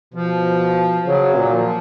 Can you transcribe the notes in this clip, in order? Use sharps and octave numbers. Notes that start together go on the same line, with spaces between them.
B2 F3
C#3 F#3
A#2
D#3
F3